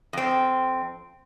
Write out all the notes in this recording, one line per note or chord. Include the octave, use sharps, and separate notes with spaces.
F2 C4